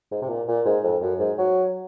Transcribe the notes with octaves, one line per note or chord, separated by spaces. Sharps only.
G#2
C3
A#2
A#2
G#2
F2
F#2
G#2
F#3